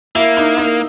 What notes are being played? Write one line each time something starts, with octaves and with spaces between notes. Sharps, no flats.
A#3 E4
D#4
D#4